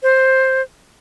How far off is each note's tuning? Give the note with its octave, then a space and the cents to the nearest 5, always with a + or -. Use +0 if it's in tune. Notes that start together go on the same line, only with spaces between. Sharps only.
C5 +10